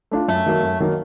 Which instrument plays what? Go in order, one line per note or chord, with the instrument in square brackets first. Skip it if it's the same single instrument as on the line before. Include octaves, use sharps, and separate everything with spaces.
[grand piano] A3 D4 F4
[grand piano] F#2 [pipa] A3
[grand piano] D#3 F#3 A#3
F#2
D#3 F#3 A#3